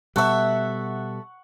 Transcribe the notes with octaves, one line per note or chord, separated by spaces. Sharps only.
B2 G3 A4 E5 F#5 C#6